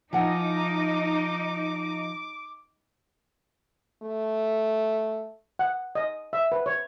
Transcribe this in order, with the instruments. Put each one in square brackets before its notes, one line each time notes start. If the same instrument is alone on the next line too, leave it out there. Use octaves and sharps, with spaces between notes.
[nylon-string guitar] F3 [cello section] D#4 [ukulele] E4 F#5 G#5 [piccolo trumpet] D6
[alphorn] A3
[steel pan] F#5
D#5
E5
B4
C#5